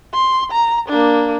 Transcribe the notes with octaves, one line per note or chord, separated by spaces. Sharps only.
C6
A#5
A#3 D4